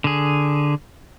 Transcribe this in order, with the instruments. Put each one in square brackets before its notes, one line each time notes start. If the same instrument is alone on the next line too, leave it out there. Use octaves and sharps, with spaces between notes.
[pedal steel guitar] D3 G#4